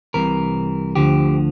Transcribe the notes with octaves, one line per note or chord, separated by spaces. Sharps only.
C2 C3 E3 A#4
D2 D3 F3 G4